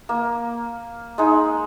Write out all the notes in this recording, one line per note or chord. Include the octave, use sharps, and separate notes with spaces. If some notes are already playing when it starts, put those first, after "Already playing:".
A#3
G#3 D#4